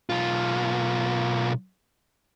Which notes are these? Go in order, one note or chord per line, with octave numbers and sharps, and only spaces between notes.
B1 F4